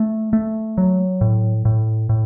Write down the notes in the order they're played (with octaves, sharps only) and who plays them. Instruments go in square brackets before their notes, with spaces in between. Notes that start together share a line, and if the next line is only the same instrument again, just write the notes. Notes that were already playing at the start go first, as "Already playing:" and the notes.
Already playing: [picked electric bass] A3
A3
F#3
A2
A2
A2